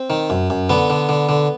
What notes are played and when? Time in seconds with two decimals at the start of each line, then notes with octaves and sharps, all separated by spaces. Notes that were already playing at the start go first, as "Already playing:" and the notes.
Already playing: C4
0.10 D#3
0.30 F#2
0.50 F#2
0.70 D3 B3
0.90 D3
1.09 D3
1.29 D3